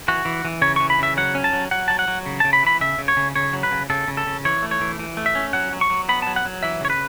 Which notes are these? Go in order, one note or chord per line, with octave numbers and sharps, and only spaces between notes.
E3 F#4
E3
E3
C#3 C#5
E3 C#6
B5
C#3 E5
F#3 F#5
C#4
A5
F#3
F#3 F#5
F#3 A5
F#5
F#3
C#3
C#3 A5
B5
E3 B5
C#3 E5
C#3
C#5
C#3
C#3 C#5
F#3
B4
C#3
C#3 A4
C#3
A4
C#3
E3 C#5
A3
C#5
E3
E3
A3
E5
C#4
F#3 F#5
F#3
C#6
F#3
B3 B5
A5
F#3
F#5
F#3
E3 E5
C#3 C#5
B4